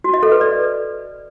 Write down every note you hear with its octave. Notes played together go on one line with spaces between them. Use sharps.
F#4
D#5
A4
B4
D5